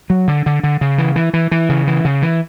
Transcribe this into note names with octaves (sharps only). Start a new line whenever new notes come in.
F#3
D3
D3
D3
C#3
E3
E3
E3
E3
C#3
E3
C#3
E3